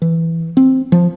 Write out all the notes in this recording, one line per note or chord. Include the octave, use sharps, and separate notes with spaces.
E3
C4
F3